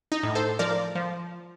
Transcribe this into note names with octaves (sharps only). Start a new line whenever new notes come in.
D#4
A2
A4 C5
F3 A#4 D5
F3